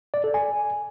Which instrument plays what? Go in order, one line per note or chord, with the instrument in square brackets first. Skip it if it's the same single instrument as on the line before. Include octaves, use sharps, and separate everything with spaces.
[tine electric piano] D5
A4
G#5